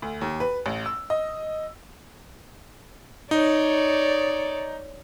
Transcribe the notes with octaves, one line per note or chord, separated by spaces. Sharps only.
D2
D#2
B4
A1
E6
D#5
D#4 C#5 D5